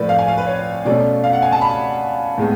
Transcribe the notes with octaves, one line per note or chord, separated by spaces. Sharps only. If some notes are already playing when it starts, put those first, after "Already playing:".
Already playing: A2 F3 A3 B4 D5
F5
G#5
F5
B4
C#5
B2 A3 C#4 D5
F5
F#5
G#5
A5
B5
A2 G#3 B3